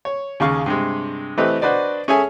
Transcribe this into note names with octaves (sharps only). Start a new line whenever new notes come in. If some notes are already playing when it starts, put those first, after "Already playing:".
C#5
D#2 C#3 G#4 F5 C#6
G2 C3 G#3
E3 A3 C4 G4 B4 D#5
D4 F#4 B4 C5 D5 D#5
C#4 G#4 A4 C#5 E5 G#5